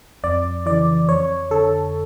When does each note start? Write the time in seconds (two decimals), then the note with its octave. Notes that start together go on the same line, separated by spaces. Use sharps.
0.24 F2 D5
0.66 C#3 E3 D5
1.08 F2 C#5
1.51 D3 A4